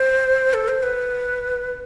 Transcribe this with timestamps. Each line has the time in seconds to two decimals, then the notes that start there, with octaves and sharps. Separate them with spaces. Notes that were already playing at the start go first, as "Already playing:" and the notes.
Already playing: C5
0.54 A4
0.68 C5
0.83 B4